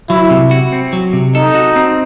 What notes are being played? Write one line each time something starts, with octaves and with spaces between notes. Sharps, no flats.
F#3 E4
C3
F#4
C4
F#3
C3
D#4 A4
F#4
C4